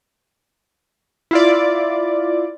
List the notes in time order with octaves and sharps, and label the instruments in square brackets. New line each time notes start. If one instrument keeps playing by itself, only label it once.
[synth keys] E4 F4 D5